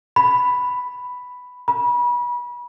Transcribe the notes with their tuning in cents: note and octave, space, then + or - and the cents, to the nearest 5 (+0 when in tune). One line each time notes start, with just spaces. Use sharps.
B5 +5
B5 -30